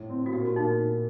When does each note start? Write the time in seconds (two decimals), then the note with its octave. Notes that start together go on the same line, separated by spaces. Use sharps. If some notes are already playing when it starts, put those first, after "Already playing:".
Already playing: A2
0.10 C4
0.26 F#4
0.33 A#2 G4
0.45 F#4
0.56 A#2 D#4